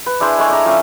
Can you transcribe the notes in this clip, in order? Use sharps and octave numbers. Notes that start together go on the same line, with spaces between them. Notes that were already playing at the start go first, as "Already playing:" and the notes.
B4
D4 E4 G#4 C5
G#3 A3 C#5
D4 A#5
F3 A3 C#4 G#5